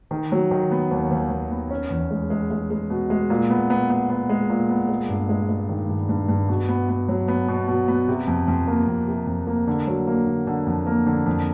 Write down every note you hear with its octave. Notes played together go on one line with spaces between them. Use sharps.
D#3
F#3
D#3
B3
D#2
D#2
D#2
B3
C#4
E2
G#3
G#3
G#3
G#3
B2
G#3
A#2
B3
B3
B3
B3
G#3
A#2
B3
G#3
G2
G#3
G#3
D#3
G2
G2
G2
B2
B3
B3
F#3
B3
B2
B2
B3
C3
F2
F2
A#3
F2
C3
F2
A#3
D3
F#3
A#3
D3
D3
F2
A#3
D3
F2